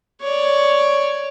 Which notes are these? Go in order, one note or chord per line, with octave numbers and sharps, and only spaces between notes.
C#5 D5